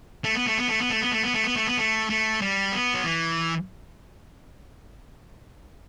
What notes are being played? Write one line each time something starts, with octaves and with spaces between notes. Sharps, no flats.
A3
B3
A3
B3
A3
B3
A3
B3
A3
B3
A3
B3
A3
B3
A3
A3
G3
B3
F#3
E3